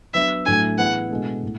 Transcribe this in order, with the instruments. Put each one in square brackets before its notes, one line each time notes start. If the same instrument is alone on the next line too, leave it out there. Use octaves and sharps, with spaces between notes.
[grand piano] F#3 B3 D4 [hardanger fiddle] E5
[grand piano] A2 F#3 A3 D4 A4 [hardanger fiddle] G#5
[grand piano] E3 B3 E4 G#4 [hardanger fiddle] F#5
[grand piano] B2 G#3 D4 A4
A2